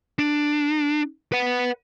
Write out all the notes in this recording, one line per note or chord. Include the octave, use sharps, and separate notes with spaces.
D4
B4 F#5